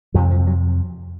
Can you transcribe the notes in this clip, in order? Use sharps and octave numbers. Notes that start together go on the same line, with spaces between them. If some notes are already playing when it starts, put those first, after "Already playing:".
F2 C3 F3
F3
F#3